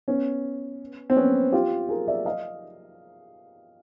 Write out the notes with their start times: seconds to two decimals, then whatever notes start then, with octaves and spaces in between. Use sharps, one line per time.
0.08 B3 C#4
1.10 C4
1.16 B3 C#4
1.52 F4 G4
1.89 G#4 A#4
2.08 D5 E5
2.25 D#5 F5